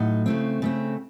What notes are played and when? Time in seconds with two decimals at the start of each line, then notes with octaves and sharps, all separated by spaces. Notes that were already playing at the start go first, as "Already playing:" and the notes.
Already playing: A2 F#3 D#4
0.26 C#3 A3 C4
0.62 C#3 A3 C4